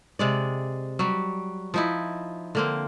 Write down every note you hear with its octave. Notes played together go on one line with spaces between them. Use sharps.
C3 G#3 D5
F#3 G3
F3 D#4 E4
D3 A#3 C4